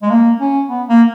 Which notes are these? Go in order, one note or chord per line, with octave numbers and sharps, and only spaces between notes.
G#3
A#3
C#4
B3
A#3